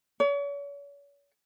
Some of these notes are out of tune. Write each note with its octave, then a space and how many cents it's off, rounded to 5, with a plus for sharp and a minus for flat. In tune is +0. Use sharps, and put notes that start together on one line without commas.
C#5 +40